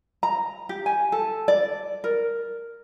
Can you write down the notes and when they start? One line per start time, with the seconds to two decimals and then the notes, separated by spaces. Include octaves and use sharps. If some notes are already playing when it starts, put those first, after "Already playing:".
0.23 A#5
0.69 G4
0.86 G#5
1.12 A4
1.48 D5
2.04 A#4